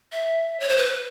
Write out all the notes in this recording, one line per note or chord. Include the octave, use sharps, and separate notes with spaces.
E5
C#5
C5
B4